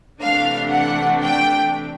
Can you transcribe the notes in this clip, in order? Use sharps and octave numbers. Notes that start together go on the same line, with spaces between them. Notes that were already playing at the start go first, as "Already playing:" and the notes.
C3 E3 A3 D4 F5
F#5
G5